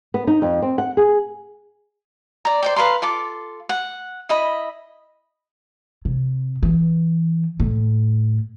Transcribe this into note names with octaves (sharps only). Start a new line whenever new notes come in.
B3
D#4
F2
C4
F#5
G#4
D5 A#5
C5 D5 G5
B4 F5 A#5 C6
F4 A4 D6
F#5
E4 D#5 B5
C3
E3
A2